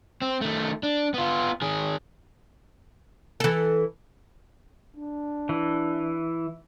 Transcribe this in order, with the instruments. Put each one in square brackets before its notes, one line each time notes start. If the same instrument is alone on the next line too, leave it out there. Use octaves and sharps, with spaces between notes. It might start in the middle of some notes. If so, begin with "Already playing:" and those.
[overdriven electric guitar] C4
D#3 A3
D4
B3 F4
D#3 G#4
[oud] E3 A4
[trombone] D4
[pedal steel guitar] E3